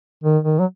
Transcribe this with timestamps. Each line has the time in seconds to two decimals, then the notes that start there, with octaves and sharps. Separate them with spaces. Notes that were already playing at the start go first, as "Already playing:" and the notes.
0.24 D#3
0.44 D#3
0.59 F#3